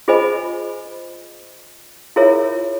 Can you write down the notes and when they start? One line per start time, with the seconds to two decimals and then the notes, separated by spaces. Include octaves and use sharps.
0.08 F4 G#4 C5 D#5 G#5 B5
2.16 E4 F4 G#4 A#4 C#5 E5